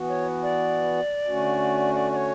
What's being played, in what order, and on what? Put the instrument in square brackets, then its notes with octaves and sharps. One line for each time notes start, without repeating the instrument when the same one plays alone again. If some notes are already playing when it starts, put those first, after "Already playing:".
Already playing: [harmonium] E3 B3 F#4
[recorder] C#5
D5
[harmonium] D3 A3 C#4 F#4
[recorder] D5
D5
C#5